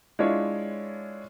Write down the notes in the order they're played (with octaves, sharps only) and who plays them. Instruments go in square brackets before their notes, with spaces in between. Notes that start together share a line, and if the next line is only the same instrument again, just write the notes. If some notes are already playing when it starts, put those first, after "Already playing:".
[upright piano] G#3 D4 E4 F4 C#5